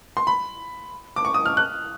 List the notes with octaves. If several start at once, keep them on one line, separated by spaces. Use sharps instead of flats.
C6
B5
D6
C#6
D#6
F6
F#6